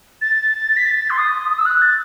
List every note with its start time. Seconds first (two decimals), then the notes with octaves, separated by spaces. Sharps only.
0.21 A6
0.76 B6
0.85 A6
1.10 C6
1.18 D#6
1.50 D#6
1.58 E6
1.65 F#6
1.81 A6